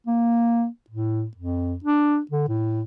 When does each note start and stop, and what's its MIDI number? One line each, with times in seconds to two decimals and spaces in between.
0.07 0.66 58
0.90 1.26 45
1.37 1.76 41
1.84 2.19 62
2.31 2.45 50
2.48 2.83 45